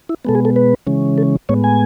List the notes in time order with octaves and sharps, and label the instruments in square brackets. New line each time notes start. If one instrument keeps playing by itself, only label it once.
[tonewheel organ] E4
B2 G#3 B3 A4
G#4
A4
B4
C#3 E3 G#3 C#4
A4
A2 G#3 B3 C#5
G#5